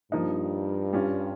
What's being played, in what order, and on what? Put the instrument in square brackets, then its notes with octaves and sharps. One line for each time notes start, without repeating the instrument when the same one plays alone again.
[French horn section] G2 [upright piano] F3 A#3 D#4
[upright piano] G3 C#4 F4